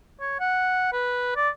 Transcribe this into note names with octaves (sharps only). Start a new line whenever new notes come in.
C#5
F#5
B4
D5